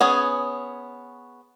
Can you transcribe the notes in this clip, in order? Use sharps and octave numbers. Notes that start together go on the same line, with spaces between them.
B3 C#4 G#4